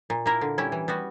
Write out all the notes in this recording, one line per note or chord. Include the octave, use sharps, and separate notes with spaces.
A#2
A#3 E4 A#4
D3
G3 C#4 E4
E3
G3 B3 F#4